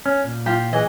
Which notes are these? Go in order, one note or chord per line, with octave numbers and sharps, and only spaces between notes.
C#4
A#2
F4 G4
E3 G#4 D#5